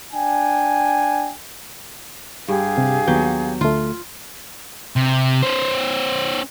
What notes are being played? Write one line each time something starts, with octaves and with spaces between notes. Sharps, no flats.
D4 G5 G#5
G2 G4 G#4 F5
C3
D#2 F#3 B3 G6
D2 A3 F4
C3
C#4 C5